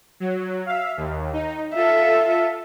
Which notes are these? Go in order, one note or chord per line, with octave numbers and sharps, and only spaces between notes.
F#3
E5 F5
D#2
D#4
F4 A4 E5